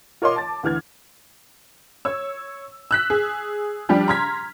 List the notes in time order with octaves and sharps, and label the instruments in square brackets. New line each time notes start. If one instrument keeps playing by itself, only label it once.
[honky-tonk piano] F4 A#4 C#5 D#5 C6 D6
A5 A6
D2 E3 F6 G#6
C#5 E6
E6 F#6 B6
G#4
F3 G3 D4 G4
A#5 C6 F6 G#6 B6